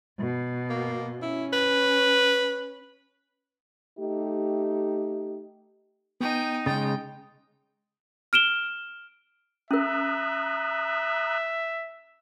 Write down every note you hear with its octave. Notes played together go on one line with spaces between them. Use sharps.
B2
A#3
C#4 E4
B4
A3 D#4 G4
B3 D#4 G5 G#5
C#3 G#3 G5 D#6 A6
F6 D7 E7 G7
C#4 A#4 E5 A#5 D#6 F#6